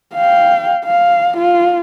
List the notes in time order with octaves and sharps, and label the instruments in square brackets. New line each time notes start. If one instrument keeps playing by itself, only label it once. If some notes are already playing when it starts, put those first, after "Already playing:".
[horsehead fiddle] F5 G5
F5
F4